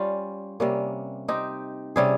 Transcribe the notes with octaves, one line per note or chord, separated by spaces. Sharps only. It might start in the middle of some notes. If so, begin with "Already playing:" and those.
Already playing: G3 C#4 F4
C3 G3 A#3 C#4
C4 D#4 G4
C3 G3 C#4 G#4